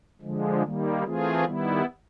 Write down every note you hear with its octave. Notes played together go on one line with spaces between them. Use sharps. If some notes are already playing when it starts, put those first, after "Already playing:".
D3 F3 G#3
D#3 G3 A#3
E3 A3 C4 F4 G#4
D#3 G3 B3 E4